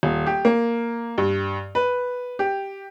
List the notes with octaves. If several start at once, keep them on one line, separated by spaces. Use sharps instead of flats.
D#1
G4
A#3
G2
B4
G4